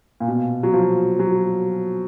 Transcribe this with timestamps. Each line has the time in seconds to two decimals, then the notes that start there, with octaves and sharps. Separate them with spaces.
0.20 A#2
0.28 B2
0.63 F#3
0.74 F3
1.19 F#3